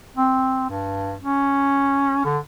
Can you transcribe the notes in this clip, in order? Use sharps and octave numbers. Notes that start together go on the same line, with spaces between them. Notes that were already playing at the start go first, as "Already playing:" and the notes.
C4
G2
C#4
D3